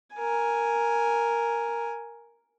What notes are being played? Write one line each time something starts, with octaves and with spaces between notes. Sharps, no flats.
A#4 G#5